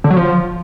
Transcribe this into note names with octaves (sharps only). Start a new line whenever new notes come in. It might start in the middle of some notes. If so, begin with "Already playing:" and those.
D3
F#3
F3